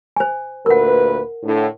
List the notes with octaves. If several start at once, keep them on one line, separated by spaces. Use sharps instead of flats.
C5 G#5
D2 A#2 A#4 B4 F#5
A2 D3